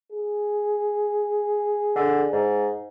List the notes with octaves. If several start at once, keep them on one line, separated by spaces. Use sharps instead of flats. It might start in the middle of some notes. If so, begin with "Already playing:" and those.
G#4
D3
G#2